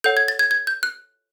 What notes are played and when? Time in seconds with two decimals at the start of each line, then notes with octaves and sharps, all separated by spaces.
0.04 A4 C#5 F#5 G6
0.17 G#6
0.28 A6
0.39 G#6
0.51 G#6
0.67 G6
0.83 F#6